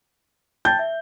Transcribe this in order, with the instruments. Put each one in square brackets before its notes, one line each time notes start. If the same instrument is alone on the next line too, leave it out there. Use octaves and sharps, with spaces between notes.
[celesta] G5 A5 A6 [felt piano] G6
[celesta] E5